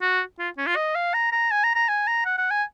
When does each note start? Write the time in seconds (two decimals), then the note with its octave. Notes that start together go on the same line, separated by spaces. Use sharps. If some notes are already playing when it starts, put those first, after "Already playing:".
0.02 F#4
0.39 F4
0.58 C#4
0.67 F4
0.76 D#5
0.95 F5
1.14 A#5
1.32 A#5
1.51 G#5
1.64 A#5
1.75 A#5
1.89 G#5
2.07 A#5
2.26 F#5
2.38 F#5
2.50 G#5